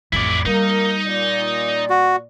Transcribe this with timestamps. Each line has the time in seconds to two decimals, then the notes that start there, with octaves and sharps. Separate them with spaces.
0.13 A1 F2 E4 D5
0.46 G3 A#3 D#4 A#4
1.06 A#2 D5
1.90 F#4